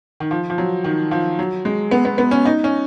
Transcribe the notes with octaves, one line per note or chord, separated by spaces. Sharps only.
D#3
F3
F3
F#3
D#3
F3
F#3
G#3
B3
B3
B3
C#4
D#4
C#4